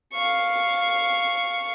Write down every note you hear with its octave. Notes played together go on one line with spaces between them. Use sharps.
F5 C#6